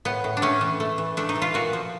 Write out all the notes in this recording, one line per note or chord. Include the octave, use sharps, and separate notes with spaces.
A2 B3
A2
D4
A3 C#4
E3
A3
E3
A3 D4
D#4
E3
F4
A#2 F#4
F3